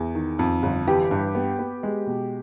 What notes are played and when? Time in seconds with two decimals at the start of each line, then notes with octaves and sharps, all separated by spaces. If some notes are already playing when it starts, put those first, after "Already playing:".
Already playing: E2
0.15 D#3
0.39 F2
0.63 G1
0.87 E3 G4
1.11 G2
1.35 B3
1.59 B3
1.83 G#3
2.06 B2